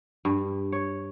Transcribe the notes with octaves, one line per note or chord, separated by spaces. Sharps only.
G2
C#5